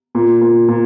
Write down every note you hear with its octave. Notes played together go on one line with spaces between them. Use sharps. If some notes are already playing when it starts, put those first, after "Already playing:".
A#2
A#2
A#2